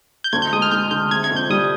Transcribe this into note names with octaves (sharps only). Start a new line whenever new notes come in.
G6
D2 G#6
G6
G#3 D#6
F6
G#3 G6
D3 G6
C3 G#6
G#6
F2
G6
G3 D#6